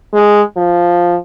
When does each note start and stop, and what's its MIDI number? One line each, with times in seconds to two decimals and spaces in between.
0.14 0.42 56
0.57 1.17 53